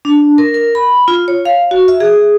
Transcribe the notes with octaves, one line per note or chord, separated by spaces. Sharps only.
D4
A#4
A#4
B5
F4
C#5
F5
F#4
E5
G#4